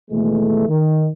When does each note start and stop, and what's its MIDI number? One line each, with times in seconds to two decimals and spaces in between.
0.11 0.68 39
0.11 0.68 47
0.11 0.68 52
0.11 0.68 56
0.11 0.68 57
0.68 1.07 51